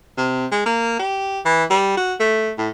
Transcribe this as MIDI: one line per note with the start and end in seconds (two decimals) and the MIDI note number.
0.18 0.46 48
0.52 0.62 56
0.66 0.96 58
0.99 1.40 67
1.45 1.64 52
1.70 1.93 55
1.97 2.15 66
2.20 2.52 57
2.58 2.69 45